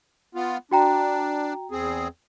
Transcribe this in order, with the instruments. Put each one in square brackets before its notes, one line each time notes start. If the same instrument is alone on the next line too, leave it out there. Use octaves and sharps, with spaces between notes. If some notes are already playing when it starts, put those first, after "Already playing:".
[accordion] B3 F4
[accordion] D4 [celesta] F#4 G5 A#5
[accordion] E2 C4 G#4